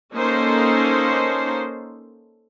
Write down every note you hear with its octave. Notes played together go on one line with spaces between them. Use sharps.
A#3 C#4 D#4 A4 C5